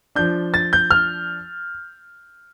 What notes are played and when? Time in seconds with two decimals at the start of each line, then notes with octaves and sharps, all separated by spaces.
0.15 F3 D4 G6
0.54 A6
0.73 G6
0.91 F6